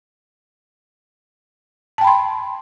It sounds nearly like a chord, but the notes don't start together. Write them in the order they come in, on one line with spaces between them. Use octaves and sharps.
A5 G5 B5 C6